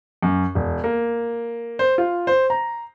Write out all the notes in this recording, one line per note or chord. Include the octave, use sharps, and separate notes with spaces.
F#2
E1
A#3
C5
F4
C5
A#5